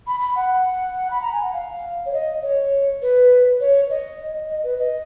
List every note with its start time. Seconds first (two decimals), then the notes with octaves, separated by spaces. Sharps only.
0.07 B5
0.20 B5
0.36 F#5
1.11 B5
1.22 A#5
1.33 G#5
1.43 F#5
1.53 F5
2.06 C#5
2.13 D#5
2.42 C#5
3.02 B4
3.60 C#5
3.90 D#5
4.49 D#5
4.64 B4
4.79 D#5